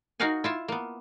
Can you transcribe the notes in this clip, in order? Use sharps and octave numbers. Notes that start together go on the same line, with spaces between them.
D#4 F#4 A#4 F5 F#5 G#5
E4 F4 E5
A#3 B3